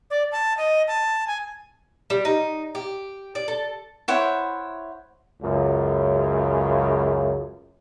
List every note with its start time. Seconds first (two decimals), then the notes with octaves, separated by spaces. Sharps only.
0.10 D5
0.32 A5
0.57 D#5
0.88 A5
1.27 G#5
2.10 G3
2.25 D#4
2.75 G4
3.35 D5
3.48 A4
4.08 E4 C5 C#5 F#5
5.43 C#2 F#2 C#3